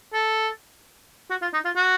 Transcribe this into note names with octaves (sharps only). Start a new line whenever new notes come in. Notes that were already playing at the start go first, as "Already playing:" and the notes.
A4
F#4
F4
D#4
F4
F#4